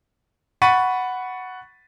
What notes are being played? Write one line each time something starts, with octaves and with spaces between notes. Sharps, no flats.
F#5 B5 C#6 A6 B6 D#7